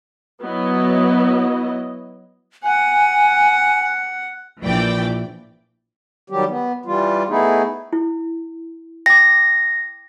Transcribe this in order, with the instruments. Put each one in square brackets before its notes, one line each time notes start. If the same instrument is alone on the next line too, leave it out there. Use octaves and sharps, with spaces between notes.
[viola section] F#3 B3 E4 D#5
[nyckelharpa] F#5 [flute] G#5
[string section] A#1 E3 D5 G5
[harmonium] D#3 F#3 G3 G4
B3
E3 G3 F4
A3 B3 D#4 E4 G#4
[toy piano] E4
[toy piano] G5 D6 [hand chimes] A#6